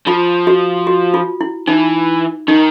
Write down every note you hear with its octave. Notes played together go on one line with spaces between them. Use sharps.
F3 F4
F#4
F#4
F4
E4
E3 D#4
D#3 D#4